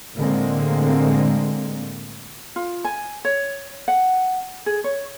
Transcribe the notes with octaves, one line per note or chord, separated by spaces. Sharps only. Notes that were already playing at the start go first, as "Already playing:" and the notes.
A2 D3 G#3 A#3 C4
F4
G#5
C#5
F#5
G#4
C#5